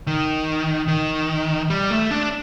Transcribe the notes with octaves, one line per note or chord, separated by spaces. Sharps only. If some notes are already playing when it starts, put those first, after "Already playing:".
D#3
D#3
G3
A3
D4